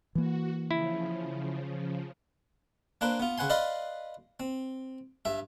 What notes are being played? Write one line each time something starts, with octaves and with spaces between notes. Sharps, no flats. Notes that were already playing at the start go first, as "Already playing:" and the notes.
E3 A#3 F#4
C#3 F3 E4
A#3 D4 B4 C5
B3 F4
C#3 B4 F#5 G#5 C6
B4 D5 D#5 F5 B5 C6
C4
G2 E5